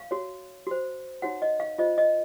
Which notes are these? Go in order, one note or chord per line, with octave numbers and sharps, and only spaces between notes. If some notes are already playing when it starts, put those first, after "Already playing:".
Already playing: F5
F#4 C#5
F#4 C5
D#4 F#4 C#5 F#5
D#5
F5
F4 C5 D#5
D#5